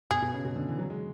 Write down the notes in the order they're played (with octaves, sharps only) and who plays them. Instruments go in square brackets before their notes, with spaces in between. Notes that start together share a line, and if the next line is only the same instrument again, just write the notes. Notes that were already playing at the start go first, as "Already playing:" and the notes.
[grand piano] B2 [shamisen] G#4
[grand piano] B2
C#3
B2
D3
E3
F#3
G#3